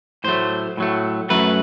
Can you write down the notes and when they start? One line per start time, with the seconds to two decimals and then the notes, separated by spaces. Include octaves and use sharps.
0.24 A2 F#3 A3 C5
0.77 A2 F#3 A3
1.30 F#2 F#3 A3 B4